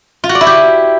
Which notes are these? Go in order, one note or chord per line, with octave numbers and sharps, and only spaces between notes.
F4
F#4
D5
E4
G4